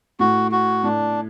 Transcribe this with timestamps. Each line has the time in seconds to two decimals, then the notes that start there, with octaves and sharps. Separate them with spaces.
0.20 A2 F#4
0.52 F#4
0.84 A2 D4